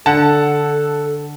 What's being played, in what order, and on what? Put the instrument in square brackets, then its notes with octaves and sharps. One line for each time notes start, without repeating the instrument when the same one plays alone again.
[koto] D3 [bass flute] A4 [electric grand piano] F#5 A5